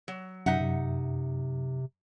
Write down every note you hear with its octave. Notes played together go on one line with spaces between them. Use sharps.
F#3
F#2 C3 D#4 E5 F#5
C3